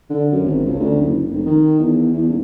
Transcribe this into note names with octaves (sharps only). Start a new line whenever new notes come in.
D3
F#2
G#1
C#2
D2
F#1
F1
D#3
E2
E2
D#1